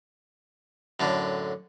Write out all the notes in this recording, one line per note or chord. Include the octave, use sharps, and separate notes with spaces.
F#2 A2 D3